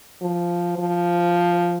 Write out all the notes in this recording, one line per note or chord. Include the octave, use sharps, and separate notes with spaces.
F3
F3